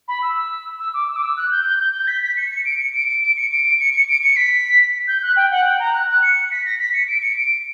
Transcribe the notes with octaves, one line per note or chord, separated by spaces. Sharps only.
B5
E6
E6
D6
E6
D6
E6
F#6
G6
G6
G6
G6
B6
B6
C#7
C#7
D7
C#7
D7
D7
D7
C#7
D7
D7
C#7
C#7
D7
C#7
B6
G6
F#6
G5
F#5
G5
A#5
F#6
F#6
C#7
B6
A#6
B6
C#7
D7
C#7
D7